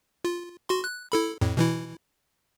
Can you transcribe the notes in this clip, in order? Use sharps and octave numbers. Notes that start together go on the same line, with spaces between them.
F4
F#4 C6
F#6
E4 A4 B5
F2 A2
B2 E3 E4